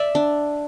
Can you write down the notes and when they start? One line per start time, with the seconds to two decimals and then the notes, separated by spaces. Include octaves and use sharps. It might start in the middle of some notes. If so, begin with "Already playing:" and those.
Already playing: D5 E5
0.15 D4